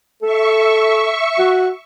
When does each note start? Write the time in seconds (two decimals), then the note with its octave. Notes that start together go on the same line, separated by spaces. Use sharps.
0.22 A4 E5 C#6
1.39 F#4